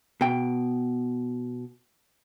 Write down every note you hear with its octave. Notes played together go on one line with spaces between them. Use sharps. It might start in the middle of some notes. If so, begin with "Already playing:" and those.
B2 G5